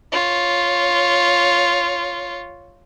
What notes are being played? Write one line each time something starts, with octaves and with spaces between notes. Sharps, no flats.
F4 C#5